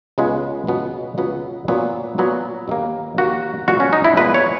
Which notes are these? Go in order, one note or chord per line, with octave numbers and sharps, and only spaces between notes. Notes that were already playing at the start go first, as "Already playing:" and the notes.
C#2 C#3 G#3 B3
C#2 B2 F#3 B3
C#2 B2 F#3 B3
A#2 F#3 B3
A#2 F#3 B3
D#2 D#3 A#3
D#2 D#3 A#3 F#4
A#2 G#3 B3 F#4
C#4
D#4
E4
A#2 G#3 B3 B4
C#5